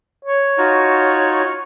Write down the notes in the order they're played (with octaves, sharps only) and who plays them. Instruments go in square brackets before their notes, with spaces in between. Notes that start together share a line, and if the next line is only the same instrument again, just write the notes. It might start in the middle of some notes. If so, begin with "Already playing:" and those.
[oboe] C#5
[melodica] D#4 F4 F#4